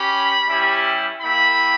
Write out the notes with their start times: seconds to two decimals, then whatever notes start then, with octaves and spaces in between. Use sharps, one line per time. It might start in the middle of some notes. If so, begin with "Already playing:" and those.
Already playing: C#4 G4 B5
0.47 G3 C#4 E4 G4
1.22 A#3 E4 G4 B5